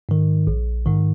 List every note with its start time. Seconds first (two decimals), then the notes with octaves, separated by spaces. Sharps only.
0.09 G#2 D#3
0.47 A#1
0.86 G#2 D#3